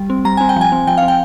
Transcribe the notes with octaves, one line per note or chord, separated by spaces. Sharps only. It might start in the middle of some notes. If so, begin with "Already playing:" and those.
Already playing: G3
C4
G3 A#5
C4 G#5
G5
F3 G#5
C4
F3 G5
F5
C4
G5